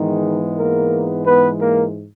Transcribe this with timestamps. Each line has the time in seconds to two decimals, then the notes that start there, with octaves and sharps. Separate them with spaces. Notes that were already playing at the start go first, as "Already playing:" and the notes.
Already playing: G#2 D#3 E3 G#3 B3 D#4
0.57 A#3 A#4
1.25 B3 B4
1.60 A#3 A#4